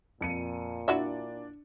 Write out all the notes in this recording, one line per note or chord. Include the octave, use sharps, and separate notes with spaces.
F2 A#2 C#7 D#7
D4 E4 F#4 E5